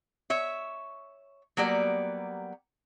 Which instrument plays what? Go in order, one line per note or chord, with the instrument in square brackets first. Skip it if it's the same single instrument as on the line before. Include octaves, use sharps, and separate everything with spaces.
[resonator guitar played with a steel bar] C#5 E5
F#3 G3 A#3 B3 G4 D5